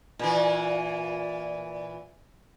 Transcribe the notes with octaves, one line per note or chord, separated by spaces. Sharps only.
A#2 E3